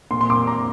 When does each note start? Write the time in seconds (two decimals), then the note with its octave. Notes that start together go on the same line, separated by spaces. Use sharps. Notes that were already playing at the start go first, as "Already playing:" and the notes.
0.11 A#2 C6
0.21 C6
0.30 D6
0.47 A#5